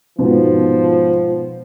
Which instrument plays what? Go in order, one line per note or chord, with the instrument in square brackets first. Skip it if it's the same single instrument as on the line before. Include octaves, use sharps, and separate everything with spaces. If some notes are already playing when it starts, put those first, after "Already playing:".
[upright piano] G#2 B2 [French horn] F3